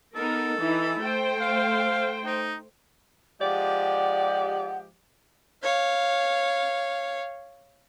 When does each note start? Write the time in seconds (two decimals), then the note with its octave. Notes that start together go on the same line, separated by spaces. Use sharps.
0.16 B3 D#4 A4 A#4
0.58 E3 D#4 E4
0.99 A3 C5 G5
1.40 F5
2.26 D#4
3.41 F3 G#3 G4 D5 F#5
5.63 C#5 F5